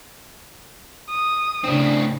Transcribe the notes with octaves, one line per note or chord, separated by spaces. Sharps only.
D#6
A2 C#3 C4 D4